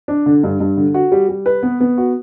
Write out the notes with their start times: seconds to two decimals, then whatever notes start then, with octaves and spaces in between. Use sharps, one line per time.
0.08 D4
0.26 D3
0.43 G2
0.60 G2
0.77 D3
0.94 F#4
1.12 G3
1.29 G3
1.46 B4
1.63 B3
1.80 B3
1.98 F#4